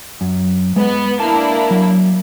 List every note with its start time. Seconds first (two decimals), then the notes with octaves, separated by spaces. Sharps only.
0.21 F#2
0.76 G#3 B3
1.20 A#3 D4 E4 A5
1.71 F#3